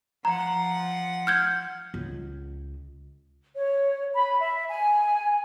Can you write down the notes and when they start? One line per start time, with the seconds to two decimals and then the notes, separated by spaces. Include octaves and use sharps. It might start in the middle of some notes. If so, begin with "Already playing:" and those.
0.25 F3 F#5 A#5
1.27 F6 G6 G#6
1.94 C#2
3.55 C#5
4.14 B5
4.41 E5
4.70 G#5